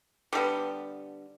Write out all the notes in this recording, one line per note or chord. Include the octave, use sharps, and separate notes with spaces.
D3 G3 B3 G4